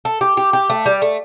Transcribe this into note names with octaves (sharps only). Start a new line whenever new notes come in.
A4
G4
G4
G4
A3
G3
A3